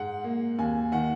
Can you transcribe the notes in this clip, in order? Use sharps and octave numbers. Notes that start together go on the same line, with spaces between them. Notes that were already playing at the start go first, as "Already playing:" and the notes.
Already playing: G#2 F#5
A#3
D#2 G#5
D#3 F#5